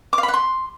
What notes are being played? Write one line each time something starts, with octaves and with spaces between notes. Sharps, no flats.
D6
F5
B5
F#5
C6